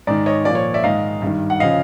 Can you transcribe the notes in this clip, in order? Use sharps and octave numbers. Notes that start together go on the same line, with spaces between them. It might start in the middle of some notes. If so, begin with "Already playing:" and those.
G#2 D#3 D5
C#5 D#5
A#2 F3 D5
C#5
D5 E5
G#2 D#3 D#5 F5
G2 D#3
F#5
C#3 F3 D#5 F5